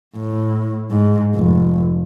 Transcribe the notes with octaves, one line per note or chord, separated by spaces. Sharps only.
A2
G#2
F1